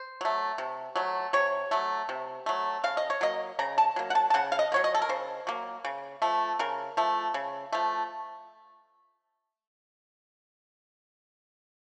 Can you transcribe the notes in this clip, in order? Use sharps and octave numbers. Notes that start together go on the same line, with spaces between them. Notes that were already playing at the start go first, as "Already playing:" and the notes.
Already playing: C5
F#3 A3
C3
F#3 A3
C3 C#5
F#3 A3
C3
F#3 A3
C#3 F5
D#5
C#5
F#3 A#3 D#5
C#3 A#5
A5
F#3 A#3
F#5
A5
A5
C#3 F#5
F5
D#5
F#3 A#3 C#5
D#5
A4
A#4
C#3 C5
F#3 A#3
C#3
F3 A3
C#3 A#4
F3 A3
C#3
F3 A3